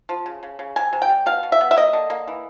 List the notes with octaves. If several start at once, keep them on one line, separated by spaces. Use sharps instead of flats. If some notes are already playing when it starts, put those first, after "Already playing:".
F3
C#3
C#3
C#3
C3 G#5
C3
G5
G3
B2 F5
B2
E5
B3
E5
A#3 D#5
D3
A#3
E3